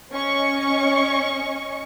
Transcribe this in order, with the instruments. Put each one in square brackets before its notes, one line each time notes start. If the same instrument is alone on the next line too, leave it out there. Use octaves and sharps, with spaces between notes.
[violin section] C#4 D#5 C#6